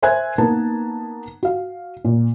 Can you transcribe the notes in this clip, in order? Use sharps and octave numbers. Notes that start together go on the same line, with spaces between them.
A#4 C5 E5 G#5 F#6 G#6
A#3 B3 D#4 A#4 B4 A5
F#4 F5
A#2